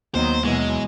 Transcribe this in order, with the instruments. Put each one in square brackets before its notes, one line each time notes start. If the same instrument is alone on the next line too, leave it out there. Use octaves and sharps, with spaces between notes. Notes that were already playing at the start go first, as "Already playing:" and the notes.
[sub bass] D#2 [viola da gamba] D#3 F#3 D#5 [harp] A#3 B3 [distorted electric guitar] C5
[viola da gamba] B2 E3 F#3 [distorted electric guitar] G#3 [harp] B4 C#6